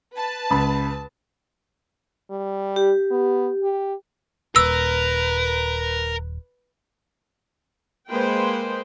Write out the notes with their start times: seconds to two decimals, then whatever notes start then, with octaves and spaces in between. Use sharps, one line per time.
0.13 B4 A5
0.50 C#2 B5
2.30 G3
2.76 G4
3.11 B3
3.63 G4
4.56 D#1 A#4 B4 E6
8.11 G#3 A#3 B4 C5 G5